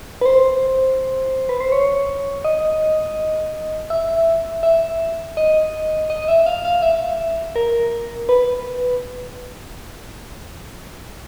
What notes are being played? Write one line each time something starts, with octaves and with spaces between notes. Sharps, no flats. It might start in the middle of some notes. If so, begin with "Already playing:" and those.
B4
C5
B4
C5
C#5
D#5
E5
E5
D#5
D#5
D#5
E5
F5
F5
E5
A#4
B4